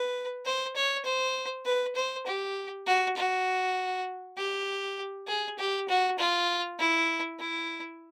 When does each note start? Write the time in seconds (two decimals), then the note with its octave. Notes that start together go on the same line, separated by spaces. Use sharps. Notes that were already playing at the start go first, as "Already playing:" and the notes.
Already playing: B4
0.45 C5
0.76 C#5
1.05 C5
1.65 B4
1.95 C5
2.26 G4
2.87 F#4
3.17 F#4
4.37 G4
5.27 G#4
5.58 G4
5.89 F#4
6.19 F4
6.79 E4
7.39 E4